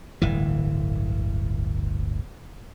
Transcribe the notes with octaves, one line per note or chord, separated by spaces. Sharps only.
D1 G1 E3